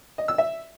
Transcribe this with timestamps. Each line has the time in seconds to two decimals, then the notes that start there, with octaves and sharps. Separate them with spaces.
0.18 D#5
0.28 E6
0.38 E5